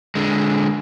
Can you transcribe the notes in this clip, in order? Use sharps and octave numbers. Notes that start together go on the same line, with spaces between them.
D3 G#3